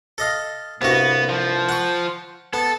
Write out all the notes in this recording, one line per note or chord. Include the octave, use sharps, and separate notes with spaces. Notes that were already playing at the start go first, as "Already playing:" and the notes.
A4 D#5 F5
C2 G2 B3 F#4
F3
F#5 C#6
B3 A4